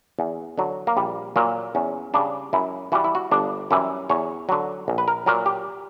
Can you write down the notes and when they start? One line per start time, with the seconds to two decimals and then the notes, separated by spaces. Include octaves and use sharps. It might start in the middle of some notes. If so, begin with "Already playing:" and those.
0.19 E2
0.58 D3 F#3
0.87 A#3
0.97 A#1 G3
1.36 A#2 F#3 A#3
1.75 E2 C#4
2.14 C#3 G3 D4
2.53 F#2 E4
2.92 E3 G3 F#4
3.04 E4
3.15 F#4
3.32 G1 D4
3.71 F#2 E3 G3 E4
4.10 E2 C#5
4.49 D3 F#3
4.88 A#1
4.98 B4
5.08 A#4
5.26 A#2 F#3 A#4
5.46 G4